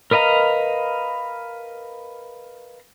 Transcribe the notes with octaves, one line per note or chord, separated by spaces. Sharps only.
A#4 B4 D#5 F5 A#5